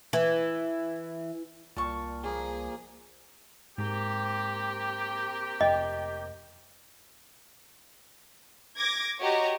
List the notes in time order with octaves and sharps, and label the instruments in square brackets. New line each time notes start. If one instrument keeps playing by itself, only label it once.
[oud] E3
[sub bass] C2 [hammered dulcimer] A#2 [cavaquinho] A5 C#6
[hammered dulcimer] A#2 F3 A#3 [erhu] G#4
[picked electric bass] G#2 [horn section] A#3 C4 G4
[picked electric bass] F1 [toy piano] D#5 [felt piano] G5
[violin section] D6 G#6 A#6
F#4 G4 C#5 D#5 A#5